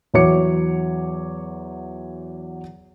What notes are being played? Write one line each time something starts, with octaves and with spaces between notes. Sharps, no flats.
E2 E3 F#3 C#5 D6 C#7